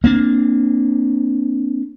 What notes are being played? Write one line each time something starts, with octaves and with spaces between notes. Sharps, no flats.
A#3 C4 D4